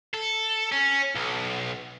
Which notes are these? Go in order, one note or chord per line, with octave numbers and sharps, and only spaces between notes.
A4
C#4
B1